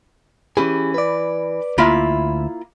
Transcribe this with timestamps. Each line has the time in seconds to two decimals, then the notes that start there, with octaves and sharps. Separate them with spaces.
0.57 E3 C#4 G4 G#4
0.94 B4 D5
1.78 D2 A#3 E4 F4 E5